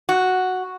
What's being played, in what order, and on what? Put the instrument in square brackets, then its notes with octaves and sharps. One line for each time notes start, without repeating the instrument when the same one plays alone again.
[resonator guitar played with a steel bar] F#4